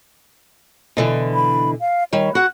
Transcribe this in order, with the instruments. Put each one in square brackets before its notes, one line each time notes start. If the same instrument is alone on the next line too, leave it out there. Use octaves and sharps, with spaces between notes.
[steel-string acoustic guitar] B2 D3 E3
[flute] B5
F5
[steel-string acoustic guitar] D#3 G3 [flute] C#5
[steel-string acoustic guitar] F#4 F#5 [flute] F#6